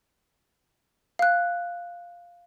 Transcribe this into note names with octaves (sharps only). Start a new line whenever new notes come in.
F5 F#6